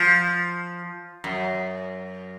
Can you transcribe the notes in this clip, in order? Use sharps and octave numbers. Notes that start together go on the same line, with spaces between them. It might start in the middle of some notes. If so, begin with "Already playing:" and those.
Already playing: F3
F#2